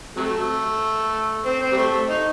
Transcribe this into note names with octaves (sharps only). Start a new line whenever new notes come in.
C3 F#3 A3
C4
C4
G3
A3
D#4